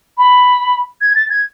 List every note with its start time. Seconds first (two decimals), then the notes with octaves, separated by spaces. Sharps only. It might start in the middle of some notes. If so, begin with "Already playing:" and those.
0.18 B5
1.01 G#6
1.15 A6
1.30 G#6